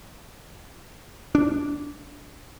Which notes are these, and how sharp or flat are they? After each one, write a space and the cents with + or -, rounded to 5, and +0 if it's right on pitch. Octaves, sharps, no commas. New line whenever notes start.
D4 -15